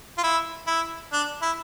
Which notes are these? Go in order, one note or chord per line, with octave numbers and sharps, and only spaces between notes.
F4
E4
E4
D4
E4